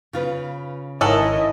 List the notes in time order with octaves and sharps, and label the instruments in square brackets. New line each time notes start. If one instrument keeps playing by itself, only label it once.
[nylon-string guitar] C#3 F4 B4
[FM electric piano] G#1 D#3 A#4 [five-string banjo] C#4 A4 F#5 [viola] E4 D#5